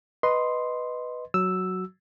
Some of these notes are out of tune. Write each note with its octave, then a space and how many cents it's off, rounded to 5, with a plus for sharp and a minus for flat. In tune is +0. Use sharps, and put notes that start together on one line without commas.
B4 +0 D#5 +0 C6 +0
F#3 +0 F#4 +0 E6 +0